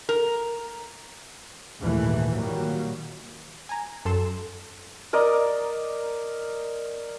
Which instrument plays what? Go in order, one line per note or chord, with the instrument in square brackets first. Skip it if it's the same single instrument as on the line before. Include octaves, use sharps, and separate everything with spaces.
[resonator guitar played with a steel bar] A#4
[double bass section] A#1 D#2 G#2 E3 A3
A#2 D#3 F#3 G3 A#3
[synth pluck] G#5 A#5
F#2 A4 C6 E7
[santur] A#4 D5 D#5